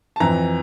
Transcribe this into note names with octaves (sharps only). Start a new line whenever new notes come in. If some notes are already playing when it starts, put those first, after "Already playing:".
A5
F2 E3 A#5